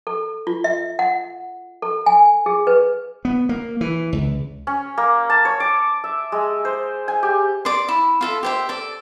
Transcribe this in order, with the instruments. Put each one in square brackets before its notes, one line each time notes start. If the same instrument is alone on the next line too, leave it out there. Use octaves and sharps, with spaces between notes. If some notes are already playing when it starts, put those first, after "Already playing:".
[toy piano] A4
F4
E5
F#5
A4
G#5
G#4
B4
[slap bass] B3
A#3
E3
C#2
[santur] C#4
A#3
A5
C#5
D6
E5
G#3
C5
G#5
G4
[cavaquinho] D5 C6
E4
F4 A4 E5
G4 C5 E5
A4 D5